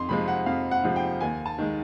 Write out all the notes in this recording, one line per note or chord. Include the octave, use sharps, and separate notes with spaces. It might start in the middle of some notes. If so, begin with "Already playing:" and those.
Already playing: F2 C6
C3 F3 G#3 B5
F#5
F2 F5
F#5
C3 F3 G#3
G5
D#2 G#5
A5
D#3 G#3